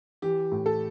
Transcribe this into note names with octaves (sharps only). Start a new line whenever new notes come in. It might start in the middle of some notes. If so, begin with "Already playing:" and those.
E3 G4
A2
A4